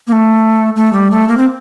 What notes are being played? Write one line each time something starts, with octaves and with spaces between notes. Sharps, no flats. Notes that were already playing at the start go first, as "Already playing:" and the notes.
A#3
A3
A3
G3
A3
A#3
C4